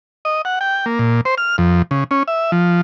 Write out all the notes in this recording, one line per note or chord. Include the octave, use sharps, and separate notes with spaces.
D#5
F#5
G5
A#3
A#2
C5
F6
F2
C#3
C#4
E5
F3